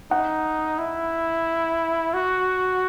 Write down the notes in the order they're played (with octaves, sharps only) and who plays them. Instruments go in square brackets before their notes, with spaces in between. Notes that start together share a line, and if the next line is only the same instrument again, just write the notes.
[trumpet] D#4 [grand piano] F#5
[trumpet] E4
F#4